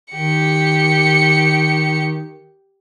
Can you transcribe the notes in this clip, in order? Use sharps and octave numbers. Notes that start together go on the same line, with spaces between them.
D#3 G4 C#7